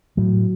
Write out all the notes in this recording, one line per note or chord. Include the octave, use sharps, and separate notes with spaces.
A2 F#3